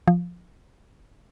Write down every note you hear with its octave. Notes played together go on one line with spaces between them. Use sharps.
F3